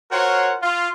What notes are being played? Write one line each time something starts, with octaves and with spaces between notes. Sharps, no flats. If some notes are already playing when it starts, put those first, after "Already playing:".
F4 F#4 A#4 C5 C#5 F#5
F4